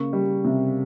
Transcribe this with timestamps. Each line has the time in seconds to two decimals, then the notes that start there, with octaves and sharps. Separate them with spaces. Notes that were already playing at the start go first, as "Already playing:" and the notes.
Already playing: C#3 A#3 C#6
0.13 G3
0.45 C3